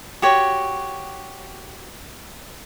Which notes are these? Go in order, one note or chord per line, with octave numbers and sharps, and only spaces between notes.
F#4 G4 C#5